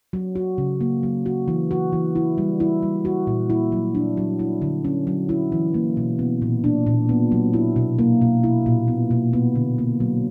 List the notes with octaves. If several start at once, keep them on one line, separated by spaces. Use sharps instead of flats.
F#3
F#4
C#3
A#3
F#3
F#4
E3
F#4
E3
E4
G3
E4
G3
F#4
A#2
E4
F#3
D4
F#3
E4
D3
C#4
F#3
E4
E3
A#3
B2
B3
A#2
D4
A#2
B3
F#3
E4
B2
A#3
B2
E4
A#2
B3
B2
B3
D3
A#3
F#3